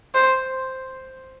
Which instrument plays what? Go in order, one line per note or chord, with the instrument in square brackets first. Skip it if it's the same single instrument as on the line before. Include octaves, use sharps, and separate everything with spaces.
[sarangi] C5